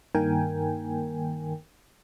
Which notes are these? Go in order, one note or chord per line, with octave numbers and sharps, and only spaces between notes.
G2 D#3 A#3 A#4 G5 G#5